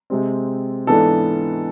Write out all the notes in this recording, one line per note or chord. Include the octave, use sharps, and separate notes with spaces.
C3 G#3 C4
G#2 E3 B3 D4 A4